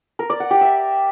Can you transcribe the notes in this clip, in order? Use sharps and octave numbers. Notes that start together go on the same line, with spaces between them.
A#4
D5
F#5
G4
E5